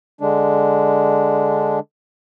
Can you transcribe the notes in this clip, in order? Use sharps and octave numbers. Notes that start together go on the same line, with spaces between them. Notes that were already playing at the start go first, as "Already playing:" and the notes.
D3 G#3 D4